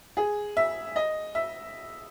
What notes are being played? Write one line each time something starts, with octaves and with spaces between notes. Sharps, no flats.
G#4
E5
D#5
E5